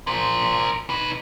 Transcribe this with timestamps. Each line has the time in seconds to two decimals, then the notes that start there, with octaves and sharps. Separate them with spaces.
0.07 A#4 C5
0.90 D#4 B4